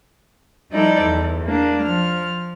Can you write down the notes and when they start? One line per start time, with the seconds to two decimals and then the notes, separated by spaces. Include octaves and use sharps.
0.71 F3 G3 D#4 E4 A4 D5
1.02 E2
1.46 A#3 D4
1.82 F3 F6